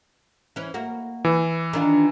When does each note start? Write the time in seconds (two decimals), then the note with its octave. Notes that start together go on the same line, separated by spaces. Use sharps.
0.56 E3 C#4
0.74 A#3 F#4
1.25 E3
1.73 D#3 D4 F4